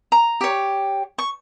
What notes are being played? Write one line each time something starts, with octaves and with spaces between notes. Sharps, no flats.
A#5
G4 C#5
C#6